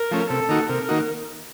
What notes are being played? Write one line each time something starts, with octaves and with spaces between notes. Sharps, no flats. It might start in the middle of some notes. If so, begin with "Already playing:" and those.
Already playing: A#4
F3 A3 C#4
C3 A4
D#3 A#3 D#4 F#4
C3 A#4
D#3 A#3 D#4 F#4